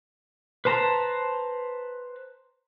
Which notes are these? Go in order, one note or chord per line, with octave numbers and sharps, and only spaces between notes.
B4 C5 A5 A#5